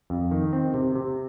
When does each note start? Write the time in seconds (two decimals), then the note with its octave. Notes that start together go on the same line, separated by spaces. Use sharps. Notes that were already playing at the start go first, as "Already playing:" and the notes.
0.10 F2
0.31 D#3
0.53 C4
0.74 C3
0.96 C3